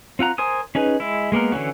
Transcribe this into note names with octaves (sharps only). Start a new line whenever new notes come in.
C4 F4 F#5 A#5
A#4 C5 G#5 D#6
C#4 D#4 G#4 B4
G#3 E4
G#3 A#3 B3 A#4
D3 E3 C#4 F#4